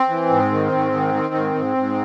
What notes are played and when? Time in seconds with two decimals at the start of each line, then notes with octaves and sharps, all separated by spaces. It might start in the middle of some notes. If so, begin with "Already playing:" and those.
Already playing: C4
0.09 E3
0.29 G#2
0.51 D#3
0.72 G#2
0.92 D#3
1.14 D#3
1.34 G#2
1.55 G#2
1.77 G#2